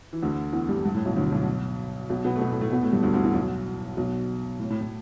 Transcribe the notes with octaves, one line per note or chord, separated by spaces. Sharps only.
E3
D2 D3
E2 E3
G2 G3
G2
A2
B1 B2
D2 D3
B1 B2
B1 B2
B2 B3
A3
B2 B3
A2 A3
A2 A3
B2 B3
A2 A3
G2 G3
D2 D3
D2 D3
E2 E3
B1 B2
B1 B2
A2
A2
A2